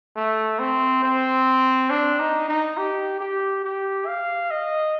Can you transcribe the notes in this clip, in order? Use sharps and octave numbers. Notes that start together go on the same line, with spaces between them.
A3
C4
C4
D4
D#4
D#4
G4
G4
G4
F5
D#5